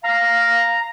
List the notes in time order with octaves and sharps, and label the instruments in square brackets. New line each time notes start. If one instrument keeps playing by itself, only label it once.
[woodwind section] F5 [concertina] A#5